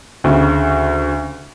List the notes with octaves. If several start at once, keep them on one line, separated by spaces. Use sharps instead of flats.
D2 C#3